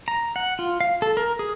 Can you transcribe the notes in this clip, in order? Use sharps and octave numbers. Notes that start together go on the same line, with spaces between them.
A#5
F#5
F4
F5
A4
A#4
G#4